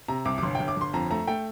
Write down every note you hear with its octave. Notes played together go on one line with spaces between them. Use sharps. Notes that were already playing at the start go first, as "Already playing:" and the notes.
C3 A#5
C2 D6
D6
G1 C6
G1 G5
D6
G1 C6
F2 A#5
A3 A#5
A3 G5